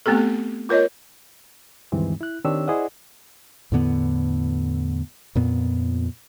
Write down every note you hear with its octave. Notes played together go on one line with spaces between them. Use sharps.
A3 B3 C4 G4 A4
F4 A#4 C#5 D#5
D2 G2 D#3 E3 G#3 C4
E4 F#6
D#3 C4 D4 G4 C#5 E6
E4 G#4 C5 D5 D#5 F#5
E2 A2 D3 B3
F2 A#2 B3